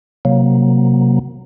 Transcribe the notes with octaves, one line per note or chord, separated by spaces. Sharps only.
C3 F#3 A#3